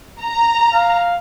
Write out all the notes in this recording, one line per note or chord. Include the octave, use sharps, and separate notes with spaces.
A#5
F5